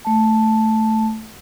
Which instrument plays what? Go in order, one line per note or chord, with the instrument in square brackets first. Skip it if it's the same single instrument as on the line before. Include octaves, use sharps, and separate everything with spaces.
[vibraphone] A3 A5